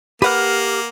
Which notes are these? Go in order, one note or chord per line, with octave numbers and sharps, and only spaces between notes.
A#3 G4 B4 F#5 F6